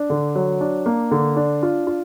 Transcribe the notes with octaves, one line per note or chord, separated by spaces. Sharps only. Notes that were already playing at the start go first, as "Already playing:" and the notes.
Already playing: D4
D3
F#3
D4
A#3
D3
D4
F4
F4